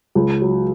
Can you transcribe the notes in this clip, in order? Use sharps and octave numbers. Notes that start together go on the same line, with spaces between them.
C#2
F#3